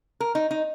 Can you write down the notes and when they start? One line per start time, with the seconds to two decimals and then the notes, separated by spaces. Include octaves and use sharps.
0.20 A#4
0.35 D#4
0.51 D#4